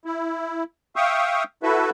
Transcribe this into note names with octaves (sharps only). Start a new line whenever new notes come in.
E4
E5 F5 G5 C#6 D#6
E4 F#4 A4 B4 E5